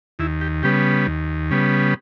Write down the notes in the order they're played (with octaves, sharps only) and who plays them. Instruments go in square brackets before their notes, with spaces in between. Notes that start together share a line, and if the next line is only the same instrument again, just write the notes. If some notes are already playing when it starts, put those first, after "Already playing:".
[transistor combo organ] D#2 E4
G4
C#3 G3 B3 G4
D#2
C#3 G3 B3